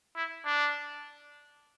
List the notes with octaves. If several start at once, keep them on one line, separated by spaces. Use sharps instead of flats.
E4
D4